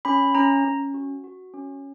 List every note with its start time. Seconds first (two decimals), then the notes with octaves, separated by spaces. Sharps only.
0.05 C#4 B5
0.35 C#4 A#5
0.65 C#4
0.94 F#4
1.24 F#4
1.54 C#4